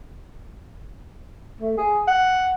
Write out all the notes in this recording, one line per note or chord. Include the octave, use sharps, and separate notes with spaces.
A3
G#4
F#5